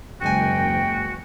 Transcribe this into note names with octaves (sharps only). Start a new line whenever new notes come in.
F#1 D#2 G#3 F#4 G5 G#5